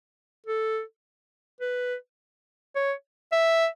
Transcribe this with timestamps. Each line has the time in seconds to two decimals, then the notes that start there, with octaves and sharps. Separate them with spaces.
0.46 A4
1.60 B4
2.75 C#5
3.32 E5